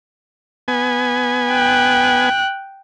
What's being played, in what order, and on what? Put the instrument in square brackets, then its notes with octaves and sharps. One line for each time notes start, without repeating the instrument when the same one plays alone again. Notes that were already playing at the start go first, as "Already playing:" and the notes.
[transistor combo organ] B3 G#5
[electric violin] G5 F#6